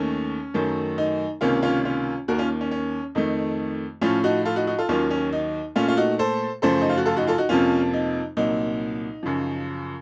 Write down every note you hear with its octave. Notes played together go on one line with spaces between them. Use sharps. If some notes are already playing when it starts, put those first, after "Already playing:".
Already playing: D#2 D#3 A3 C#4
F#2 D#3 F#3 A3
D#4
C#2 C3 D#3 A#3 C#4 F4
C#4 F4
C#4 F4
D#2 D#3 A#3 F#4 A#4
C#4 F4
C#4
C#4
F2 D#3 A3 D#4
A2 F3 A3 C#4 F4
D#4 F#4
F4 A4
D#4 F#4
D#4 F#4
F4 A4
D#2 D#3 F#3 A#3 C#4 F4
C#4
D#4
A#2 A3 C#4 F4
F4
D#4 F#4
A4 C5
F#2 C#3 F3 A3 A4 C5
D#4
F4
F#4
F4 A4
D#4 F#4
F4 A4
D#4 F#4
F2 C3 F3 A#3 C#4 F4
D#4
C2 A#2 F#3 D#4
F#2 C#3 F3